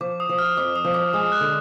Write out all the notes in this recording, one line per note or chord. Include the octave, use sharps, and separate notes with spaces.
F3 D6
D#6
F3
F6
F2 D6
D#6
F3
D6
G#3 D#6
F#6
D3